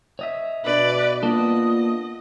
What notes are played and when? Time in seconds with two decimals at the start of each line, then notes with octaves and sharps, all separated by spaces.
0.19 C#5 D#5 E5
0.65 B2 D4 B4 D5
1.23 A#3 B3 D4 F4 A4 D#5